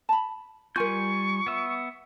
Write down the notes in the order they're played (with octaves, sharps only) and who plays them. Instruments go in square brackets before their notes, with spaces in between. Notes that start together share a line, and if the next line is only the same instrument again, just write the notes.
[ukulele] A5 B5
[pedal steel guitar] G3 G#5 G6 [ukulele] F4 A#4 [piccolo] C#6
[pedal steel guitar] B3 E5